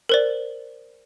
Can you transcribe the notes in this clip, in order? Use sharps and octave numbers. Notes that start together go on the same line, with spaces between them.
A#4 C5 D5